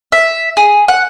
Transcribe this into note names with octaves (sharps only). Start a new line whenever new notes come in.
E5
G#4
F#5